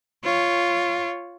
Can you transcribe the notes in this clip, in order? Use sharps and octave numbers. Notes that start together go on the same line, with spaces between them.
F4 C#5